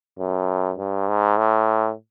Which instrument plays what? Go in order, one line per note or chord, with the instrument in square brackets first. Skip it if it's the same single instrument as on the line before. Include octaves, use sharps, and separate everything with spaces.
[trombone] F#2
G2
G#2
A2